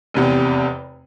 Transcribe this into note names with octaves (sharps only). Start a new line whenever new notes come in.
F1 E2 C3